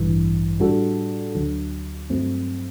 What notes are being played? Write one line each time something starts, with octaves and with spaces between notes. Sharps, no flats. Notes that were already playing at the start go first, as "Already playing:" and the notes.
Already playing: A1 G2 E3
A2 G3 D4 F#4 A4
D2 D3 F#3
G2 F#3 A3 C4